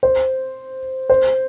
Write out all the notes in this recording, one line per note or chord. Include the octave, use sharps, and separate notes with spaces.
C5
C5